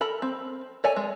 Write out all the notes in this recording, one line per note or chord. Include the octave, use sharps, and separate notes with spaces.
A4 A#4 B5
C4
A4 C#5 D5 E5 G#5
G#3